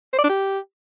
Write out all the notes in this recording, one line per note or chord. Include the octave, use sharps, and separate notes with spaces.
C5
D5
D4
G4